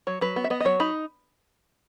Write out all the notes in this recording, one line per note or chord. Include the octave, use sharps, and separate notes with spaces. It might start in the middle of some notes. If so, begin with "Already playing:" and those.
F#3 C#5
F#3 B4
B3
E5
B3 D#5
D#5
F#3 C#5
D#4 B5